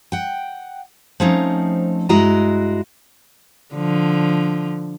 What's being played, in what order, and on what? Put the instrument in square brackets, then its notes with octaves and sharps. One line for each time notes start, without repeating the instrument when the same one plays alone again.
[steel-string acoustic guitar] F#5 G5
F3 A3 C4 C#4 D#4
G2 G#3 E4 F#4 D#5 A#5
[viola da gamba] D3 F3